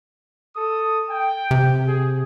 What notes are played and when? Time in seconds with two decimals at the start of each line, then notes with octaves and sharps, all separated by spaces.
0.55 A4 D#6
1.10 G5
1.51 C3
1.88 G#4